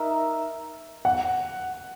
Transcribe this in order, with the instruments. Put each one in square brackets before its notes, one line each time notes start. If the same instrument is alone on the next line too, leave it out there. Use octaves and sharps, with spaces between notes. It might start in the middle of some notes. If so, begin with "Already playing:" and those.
Already playing: [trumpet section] D#4 A#4 E5
[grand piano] F#5